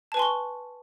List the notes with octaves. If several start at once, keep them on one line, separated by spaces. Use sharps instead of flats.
B4 G#5 A5 C6 C#6